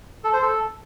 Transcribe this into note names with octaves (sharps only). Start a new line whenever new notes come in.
A4
C5
A4